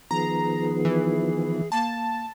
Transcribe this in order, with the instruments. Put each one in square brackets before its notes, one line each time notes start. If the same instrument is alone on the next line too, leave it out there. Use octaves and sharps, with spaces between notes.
[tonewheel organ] D#3 F3 B3 [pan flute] G#4 [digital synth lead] A#5
[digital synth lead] E3
[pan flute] A#3 [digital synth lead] A5